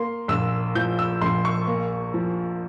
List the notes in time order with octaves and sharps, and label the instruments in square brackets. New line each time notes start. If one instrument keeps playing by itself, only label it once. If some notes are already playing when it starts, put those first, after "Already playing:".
Already playing: [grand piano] A#3 C6
A#1 E6
F3 G6
E6
A#1 C6
C#6
A#3
F3